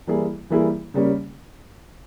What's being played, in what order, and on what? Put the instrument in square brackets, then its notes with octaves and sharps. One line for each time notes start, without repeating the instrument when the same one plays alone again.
[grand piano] E3 G3 A#3 E4 G#4
E3 G3 A#3 E4 G#4
C#3 G3 A#3 C#4